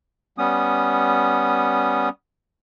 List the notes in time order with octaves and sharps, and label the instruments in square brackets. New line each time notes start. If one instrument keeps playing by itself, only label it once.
[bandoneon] G3 B3 C#4 D#6